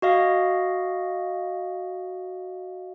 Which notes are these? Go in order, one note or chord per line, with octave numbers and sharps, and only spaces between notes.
F#4 D#5 F5